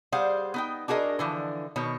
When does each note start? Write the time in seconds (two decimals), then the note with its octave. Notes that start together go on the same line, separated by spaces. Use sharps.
0.12 G3 G#4 C5 F5 F#5
0.54 B3 D#4 G5
0.88 D4 F#4 G#4 A#4 D#5
1.19 D3 E3 F3
1.76 B2 D#3 C#5